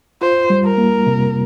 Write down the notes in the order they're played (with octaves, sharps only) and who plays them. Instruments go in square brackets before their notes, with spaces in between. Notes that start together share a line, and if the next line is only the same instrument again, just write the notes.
[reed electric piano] F4 [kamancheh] C5
[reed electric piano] G3
[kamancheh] A#4
[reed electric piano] A#3
C3